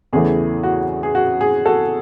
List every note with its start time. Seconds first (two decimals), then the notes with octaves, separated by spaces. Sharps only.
0.13 E2 C#3 E3 A3 G#4
0.63 F#4
1.03 G#4
1.15 F#4
1.41 G#4
1.66 F#4 A4